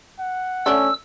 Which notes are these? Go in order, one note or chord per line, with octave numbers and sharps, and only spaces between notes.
F#5
A3 C#4 D4 E6